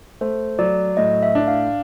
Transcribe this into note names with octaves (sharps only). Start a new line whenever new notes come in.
A3 C5
F#3 D5
A2 D#5
E5
D4
F5